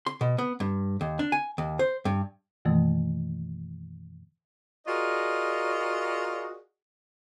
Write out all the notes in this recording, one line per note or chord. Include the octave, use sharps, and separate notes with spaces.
C6
B2
B3
G2
D#2
D4
G#5
D#2
C5
G2
F#2 B2 D#3 E3 A3 A#3
F4 F#4 G#4 A#4 D5 D#5